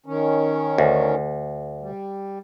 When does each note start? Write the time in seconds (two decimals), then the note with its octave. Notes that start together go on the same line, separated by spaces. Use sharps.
0.06 D#3 C#4
0.78 D2
1.81 G3